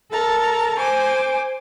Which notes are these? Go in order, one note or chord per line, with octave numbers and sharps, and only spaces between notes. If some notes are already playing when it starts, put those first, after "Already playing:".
A4 A#4 A5 A#5
C5 G#5 D6